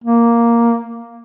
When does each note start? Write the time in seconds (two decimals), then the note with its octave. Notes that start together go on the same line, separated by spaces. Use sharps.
0.04 A#3